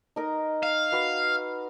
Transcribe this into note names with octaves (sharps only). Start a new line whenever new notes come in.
D#4 A#4 D#5
F5
F#4 B4